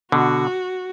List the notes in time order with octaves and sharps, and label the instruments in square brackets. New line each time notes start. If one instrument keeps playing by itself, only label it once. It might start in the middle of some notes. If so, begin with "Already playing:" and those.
[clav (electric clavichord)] B2 D3 [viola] F#4